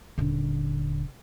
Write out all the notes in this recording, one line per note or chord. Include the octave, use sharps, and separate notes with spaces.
D#1 D3